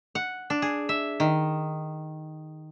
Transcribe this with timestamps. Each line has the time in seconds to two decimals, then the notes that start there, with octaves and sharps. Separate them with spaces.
0.15 F#5
0.50 D4
0.62 G#4
0.89 E5
1.20 D#3